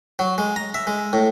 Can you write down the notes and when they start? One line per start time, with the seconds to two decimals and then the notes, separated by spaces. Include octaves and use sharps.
0.19 F#3
0.38 G#3
0.56 A#5
0.74 E5
0.87 G#3
1.13 A2